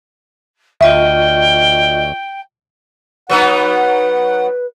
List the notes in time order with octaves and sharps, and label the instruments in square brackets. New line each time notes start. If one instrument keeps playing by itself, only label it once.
[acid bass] D2 [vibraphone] F4 D#5 C#6 [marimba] E5 [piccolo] G5
[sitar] F#3 B3 D#4 [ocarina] B4 [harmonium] F#5